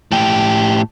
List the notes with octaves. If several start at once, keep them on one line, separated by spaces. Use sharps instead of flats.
A2 G4